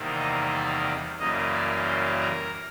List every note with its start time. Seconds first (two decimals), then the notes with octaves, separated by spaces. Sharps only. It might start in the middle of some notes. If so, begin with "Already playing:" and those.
Already playing: E2 C3 D#3 G3 A#3
0.18 D#5
0.52 D5
1.19 F#2 C#3 E3 G3 A#3 D#5
1.53 D5
1.87 C5
2.20 A#4